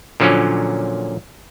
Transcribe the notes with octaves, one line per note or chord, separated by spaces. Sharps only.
A#2 D3 F3 F#3 A#3 C#4